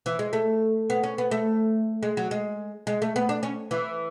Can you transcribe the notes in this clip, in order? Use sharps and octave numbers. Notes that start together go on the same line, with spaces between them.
E3
G#3
A3
B3
C#4
B3
A3
G#3
F#3
G#3
G#3
A3
B3
D4
C#4
E3